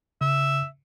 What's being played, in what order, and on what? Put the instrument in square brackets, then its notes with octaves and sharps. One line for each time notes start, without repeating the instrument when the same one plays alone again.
[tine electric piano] C#3 [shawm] E5